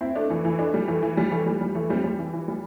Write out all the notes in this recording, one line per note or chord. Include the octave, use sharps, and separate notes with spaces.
C4 E4
A3 D4
E3 A3
E3 A3
A3 D4
G3
E3 A3
E3
G3
E3 A3
G3
G3
E3 A3
G3 C4
G3
E3
E3
G3